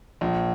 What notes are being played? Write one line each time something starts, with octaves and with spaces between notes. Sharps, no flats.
A#1